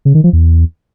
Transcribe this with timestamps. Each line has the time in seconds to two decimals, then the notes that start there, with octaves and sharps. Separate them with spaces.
0.05 C#3
0.15 D#3
0.24 F3
0.33 E2